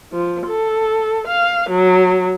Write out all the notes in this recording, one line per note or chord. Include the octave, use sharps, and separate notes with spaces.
F3
A4
F5
F#3